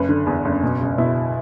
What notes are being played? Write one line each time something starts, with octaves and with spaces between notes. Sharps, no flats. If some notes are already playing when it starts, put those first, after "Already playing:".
Already playing: F#1 B4
D3
E2
F#1
B2
C#2
B2 E4